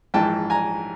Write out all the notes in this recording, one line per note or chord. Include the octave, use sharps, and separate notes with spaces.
A#1 G#2 E3 G5 A5
G#5 A#5